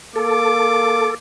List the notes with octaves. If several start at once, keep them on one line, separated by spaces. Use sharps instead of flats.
A#3 A4 D6